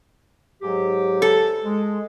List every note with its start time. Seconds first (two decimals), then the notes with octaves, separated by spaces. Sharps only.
0.62 G#2 F#3 G4
1.22 A4
1.64 G#3